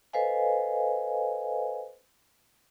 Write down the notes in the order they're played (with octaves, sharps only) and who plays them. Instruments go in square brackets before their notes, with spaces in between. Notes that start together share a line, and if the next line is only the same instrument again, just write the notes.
[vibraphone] A4 B4 C5 D#5 F5 G#5